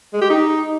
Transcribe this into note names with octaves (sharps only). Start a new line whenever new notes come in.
G#3
G4
D#4